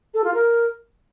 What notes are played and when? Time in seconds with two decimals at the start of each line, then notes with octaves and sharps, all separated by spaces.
0.14 A4
0.24 F4
0.34 A#4